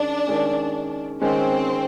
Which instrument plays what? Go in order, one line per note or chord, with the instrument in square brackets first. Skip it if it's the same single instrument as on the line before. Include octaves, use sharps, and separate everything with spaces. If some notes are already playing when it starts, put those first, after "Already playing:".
Already playing: [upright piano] D#3 G#3 C#4 [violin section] D4
[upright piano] D#3 G#3 C#4
[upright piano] D#3 G#3 C#4 [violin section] C4